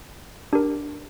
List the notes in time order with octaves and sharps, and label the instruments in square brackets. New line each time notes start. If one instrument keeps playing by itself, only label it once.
[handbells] D4 G4 A#4